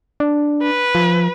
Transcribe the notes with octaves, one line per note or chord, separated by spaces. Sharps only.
D4
B4
F3